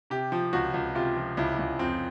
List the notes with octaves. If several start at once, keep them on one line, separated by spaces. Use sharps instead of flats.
C3 G4
F3
C#2 F#4
C#2
C3 F4
F3
C#2 E4
C#2
F2 C4